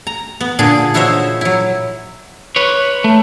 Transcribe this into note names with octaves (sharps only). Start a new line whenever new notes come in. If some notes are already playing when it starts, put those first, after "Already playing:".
A#5
B3
A#2 D3 G#4
D#4 E4 F#4 C5 C#5 E5
F#3 E4
B4 C#5
A3